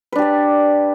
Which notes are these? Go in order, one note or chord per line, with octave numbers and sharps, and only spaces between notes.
D4 G4 B4 D5